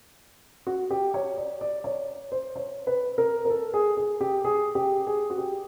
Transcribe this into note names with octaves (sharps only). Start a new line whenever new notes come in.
F#4
G4
C#5
D5
D5
C#5
C5
C#5
B4
A#4
A#4
A4
G#4
G#4
G4
G#4
G4
G#4
F#4
G4